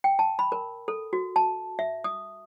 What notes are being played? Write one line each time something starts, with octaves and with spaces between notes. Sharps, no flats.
G5
A5
B5
A#4
A4
F#4
A5
E5
D#6